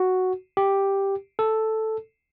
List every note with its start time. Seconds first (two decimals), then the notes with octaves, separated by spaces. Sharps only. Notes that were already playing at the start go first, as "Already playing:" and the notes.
Already playing: F#4
0.57 G4
1.39 A4